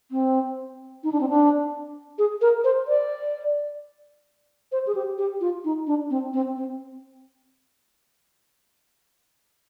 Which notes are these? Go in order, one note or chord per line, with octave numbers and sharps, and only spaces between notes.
C4
D#4
D4
C4
D4
G#4
A#4
C5
D5
C5
G#4
G4
G4
F4
D#4
D4
C4
C4
C4